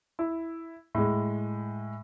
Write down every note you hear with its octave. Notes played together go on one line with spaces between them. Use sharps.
E4
A2 G#3